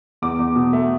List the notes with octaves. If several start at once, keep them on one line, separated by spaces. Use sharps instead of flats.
E2 D6
E2
B2
A3